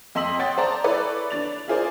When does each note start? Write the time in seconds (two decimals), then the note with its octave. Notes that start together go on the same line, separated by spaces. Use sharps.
0.15 F2 D#5 C6 E6 B6 F#7
0.39 C#5 F#5 G5 C6 D#6 A6
0.58 C5 D5 A5 A#5
0.84 E4 A4 B4 C#5 D5
1.31 D4 A6 F7
1.68 E4 F4 G#4 A#4 C5 D5